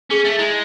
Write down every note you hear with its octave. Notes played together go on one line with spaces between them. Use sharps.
C#4 G#4
A3
G#3 E4